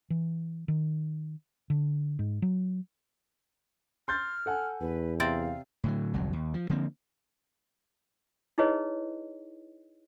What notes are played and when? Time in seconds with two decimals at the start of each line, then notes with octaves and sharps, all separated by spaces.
0.10 E3
0.68 D#3
1.70 D3
2.19 G#2
2.42 F#3
4.08 C6 F6 G6 A6
4.46 A4 F#5 G#5
4.81 E2 B4
5.20 C3 C4 D5 F5
5.84 A2 D3 F#3
6.14 G1 C2 F2 F#3
6.33 D#2
6.54 F3
6.69 D3 F3 A#3 C4
8.58 D#4 E4 G#4 B4 C#5 D#5